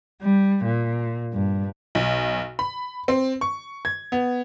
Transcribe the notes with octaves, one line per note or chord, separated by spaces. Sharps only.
G3
A#2
G2
B1
B5
C4
C#6
G#6
B3